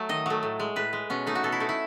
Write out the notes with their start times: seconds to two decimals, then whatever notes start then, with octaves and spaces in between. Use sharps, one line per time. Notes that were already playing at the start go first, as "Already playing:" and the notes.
Already playing: F#3 A3
0.09 D#3 D#5
0.26 F#3 A3
0.43 A2
0.60 G#3
0.76 A2 B4
0.93 G#3
1.10 B2 C#4
1.26 A3 D#4
1.35 F#4
1.43 B2 A4
1.52 E4
1.60 A3 D#4
1.69 E4